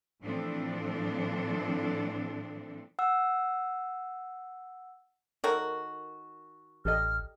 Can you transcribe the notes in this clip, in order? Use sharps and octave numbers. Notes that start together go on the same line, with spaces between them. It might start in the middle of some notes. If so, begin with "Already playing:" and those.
A2 E3 F3 C4 D4 A4
F#5 E6
D#3 F#4 A4 A#4 C#5
A1 G4 A4 D#5 F6